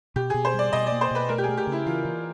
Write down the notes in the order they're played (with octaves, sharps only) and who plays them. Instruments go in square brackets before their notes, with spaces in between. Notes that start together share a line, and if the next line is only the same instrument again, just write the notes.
[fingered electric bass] B2 [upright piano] G4
[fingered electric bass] B2 [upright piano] G#4
[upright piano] C5
[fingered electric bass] G3 [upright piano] D5
[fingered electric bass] B2 [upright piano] D#5
[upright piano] D5
[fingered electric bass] A#3
[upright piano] C5
[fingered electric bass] B2 [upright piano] B4
[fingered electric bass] A3 [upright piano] A#4
[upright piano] G4
G#4
[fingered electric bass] A3
[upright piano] G4
[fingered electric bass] C#3
[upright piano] E4
[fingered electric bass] E3 [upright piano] F4
[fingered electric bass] E3